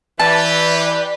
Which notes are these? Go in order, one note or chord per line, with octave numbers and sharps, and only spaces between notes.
E3 G4 B4 D5 A5